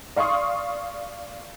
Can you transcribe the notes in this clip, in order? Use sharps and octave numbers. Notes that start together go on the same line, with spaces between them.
D5 F5 C6 C#6 D#6